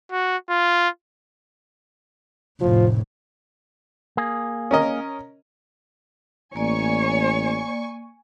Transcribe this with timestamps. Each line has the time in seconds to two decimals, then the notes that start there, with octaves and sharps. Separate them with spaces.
0.12 F#4
0.50 F4
2.61 F1 A2 F3
4.17 A#3 G#4
4.71 C#4 A#4 D#5
6.56 A1 A#3 C#5 D5 G#5 C#6